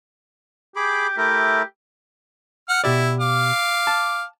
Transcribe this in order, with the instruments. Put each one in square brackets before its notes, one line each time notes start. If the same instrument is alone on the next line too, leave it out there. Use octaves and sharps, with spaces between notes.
[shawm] G4 [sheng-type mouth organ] G#4 B5 D6
[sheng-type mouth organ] A3 E4 A#4 [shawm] G4
[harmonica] F#5 F6
[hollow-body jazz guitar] B2 G4 D5 [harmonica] E4
[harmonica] F5 D6
[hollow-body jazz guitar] A5